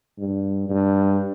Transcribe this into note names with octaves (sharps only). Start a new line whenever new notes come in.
G2
G2